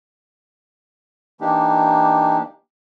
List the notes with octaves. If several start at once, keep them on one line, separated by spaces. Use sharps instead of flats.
E3 A#3 D4 D#4 G4